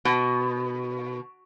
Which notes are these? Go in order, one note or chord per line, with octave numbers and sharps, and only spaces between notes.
B2